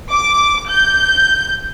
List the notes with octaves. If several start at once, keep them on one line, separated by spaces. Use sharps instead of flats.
D6
G6